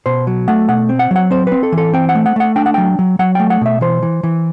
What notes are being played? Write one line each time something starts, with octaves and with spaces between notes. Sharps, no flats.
B2 C5
F#3
A3 F#5
B2 F#5
C4
F#5
F#3 F#5
C4 C5
C4 B4
A4
E3
A4
C4 G5
F#5
A3
F#5
A3 F#5
D4 G5
F#5
F#3 G5
F#3
F#3 F#5
A3 G5
F#5
B2 E5
E3 C5
E3
E3